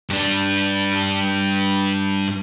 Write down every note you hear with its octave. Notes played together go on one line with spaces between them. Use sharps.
G2 D4